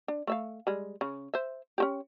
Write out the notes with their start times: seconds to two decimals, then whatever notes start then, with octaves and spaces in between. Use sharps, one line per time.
0.08 D4
0.27 A3 E5 F5
0.67 G3 G#3
1.01 C#3
1.34 C5 E5
1.78 C#4 F#4 G4